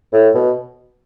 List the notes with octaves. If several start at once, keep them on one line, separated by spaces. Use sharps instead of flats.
A2
B2